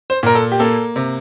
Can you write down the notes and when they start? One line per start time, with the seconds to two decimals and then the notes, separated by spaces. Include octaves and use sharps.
0.10 C5
0.23 A#2 A#4
0.35 A4
0.52 G4
0.60 A#3 A4
0.96 C3